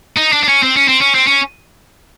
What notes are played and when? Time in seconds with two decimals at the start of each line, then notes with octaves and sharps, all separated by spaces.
0.16 D#4
0.32 D4
0.43 D4
0.48 C#4
0.63 C4
0.76 C#4
0.88 C4
1.01 C#4
1.15 C4
1.27 C#4